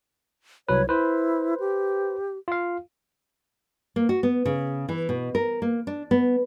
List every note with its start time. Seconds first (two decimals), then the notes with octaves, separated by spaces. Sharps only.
0.69 C2 F#3 B4 C#5
0.89 E4 B4 C5
1.60 G4
2.48 F4 F5
3.96 A#3
4.09 F#4
4.23 B3
4.45 C#3
4.89 E3
5.09 B2
5.35 A#4
5.62 A#3
5.87 D4
6.11 B3